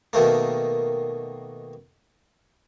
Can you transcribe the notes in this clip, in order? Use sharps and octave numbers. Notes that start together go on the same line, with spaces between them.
B2 D#3 A3 A#3